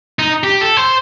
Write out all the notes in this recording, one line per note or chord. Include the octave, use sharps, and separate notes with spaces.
D#4
G4
A4
C5